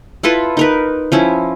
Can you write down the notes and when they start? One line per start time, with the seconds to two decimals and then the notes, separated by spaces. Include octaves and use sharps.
0.23 E4 F4 A4 B4
0.57 D#4 A#4 B4
1.12 F3 C#4 E4